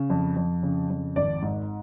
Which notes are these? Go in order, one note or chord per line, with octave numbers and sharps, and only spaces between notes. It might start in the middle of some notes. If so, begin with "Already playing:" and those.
Already playing: C#3
F2
F2
C#3
F2
G#1 D5
G#2